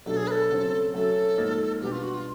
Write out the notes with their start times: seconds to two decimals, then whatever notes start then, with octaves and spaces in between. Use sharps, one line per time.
0.06 B2 F#3 A3 D4 G4 A4
0.17 G#4
0.27 B4
0.31 A4
0.50 C#3 F#3 A3 C4
0.94 F#3 A3 C#4 F#4 A4
1.37 G#2 F3 A#3 D#4
1.81 B2 G3 B3 D4 G4
1.92 F4
2.03 F#4
2.14 F4